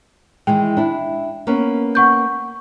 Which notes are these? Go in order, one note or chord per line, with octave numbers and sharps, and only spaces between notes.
D#3 E3 G#3 G5
D4 E4
A#3 B3 C#4
F#5 C#6 G6